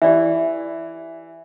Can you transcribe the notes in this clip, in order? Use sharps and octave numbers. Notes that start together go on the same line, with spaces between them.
E3 G4 D5 E5